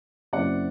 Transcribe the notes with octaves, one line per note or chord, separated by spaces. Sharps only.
F#1 F#2 F#3 C4 E4 D5 F#5